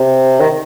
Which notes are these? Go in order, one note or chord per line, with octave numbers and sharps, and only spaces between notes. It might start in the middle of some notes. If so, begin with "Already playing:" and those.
Already playing: C3
D#3